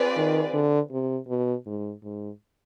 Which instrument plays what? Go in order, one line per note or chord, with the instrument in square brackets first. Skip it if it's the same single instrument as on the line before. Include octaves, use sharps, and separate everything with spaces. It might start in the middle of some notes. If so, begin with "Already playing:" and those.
Already playing: [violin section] C4 F4 G#4 B4 D5
[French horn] D#3
D3
C3
B2
G#2
G#2